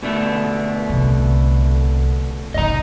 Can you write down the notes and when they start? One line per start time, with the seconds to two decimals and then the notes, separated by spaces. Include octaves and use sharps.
0.03 B2 D3 A3
0.89 C2 C3
2.54 A2 C#3 D#5 A#5